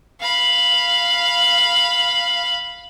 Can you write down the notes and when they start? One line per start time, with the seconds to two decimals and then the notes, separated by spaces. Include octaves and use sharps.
0.20 F5 B5